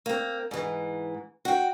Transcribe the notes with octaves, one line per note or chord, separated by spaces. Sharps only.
A#3 C4
G#2 E3
F#4 G5